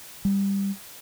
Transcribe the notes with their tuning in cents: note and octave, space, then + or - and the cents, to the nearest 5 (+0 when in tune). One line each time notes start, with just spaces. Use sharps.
G3 +15